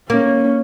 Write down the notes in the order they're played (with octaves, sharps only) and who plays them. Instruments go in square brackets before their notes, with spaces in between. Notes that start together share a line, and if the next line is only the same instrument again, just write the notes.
[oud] A#3 [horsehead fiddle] C#4